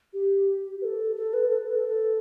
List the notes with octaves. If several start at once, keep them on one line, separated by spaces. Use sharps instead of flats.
G4
B4
A4
A4
B4
A4
B4
A4